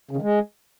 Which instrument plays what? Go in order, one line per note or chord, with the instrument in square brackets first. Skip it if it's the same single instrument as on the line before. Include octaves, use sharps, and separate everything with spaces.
[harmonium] C#3
D#3
G#3